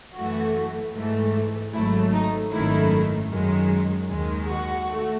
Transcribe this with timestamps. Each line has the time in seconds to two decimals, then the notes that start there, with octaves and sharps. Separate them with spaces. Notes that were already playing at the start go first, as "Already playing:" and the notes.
0.16 F#2 E3 A3 F#4
0.95 G#2 E3 A3
1.74 G#1 G#2 F#3 A3 E4
2.13 D#4
2.52 G#1 F#2 D#3 A3 E4
3.32 F#2 D#3 G#3
4.09 D#2 D#3 G#3
4.49 F#4
4.89 A3